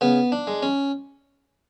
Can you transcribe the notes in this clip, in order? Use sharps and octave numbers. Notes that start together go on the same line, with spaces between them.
C#3 B3
D4
G#3
C#4